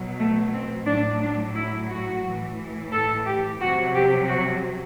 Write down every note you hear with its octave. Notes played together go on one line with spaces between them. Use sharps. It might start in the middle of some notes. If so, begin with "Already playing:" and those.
Already playing: B2 F#3
A3
C4
A2 F#3 D4
D4
E4
F#4
A2 E3
A4
G4
C3 F#3 F#4
G4
F#4